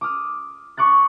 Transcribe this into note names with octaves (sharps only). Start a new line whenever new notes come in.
D6 D#6 F6
C#6 D6 F#6 A6